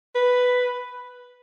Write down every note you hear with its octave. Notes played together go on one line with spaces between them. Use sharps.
B4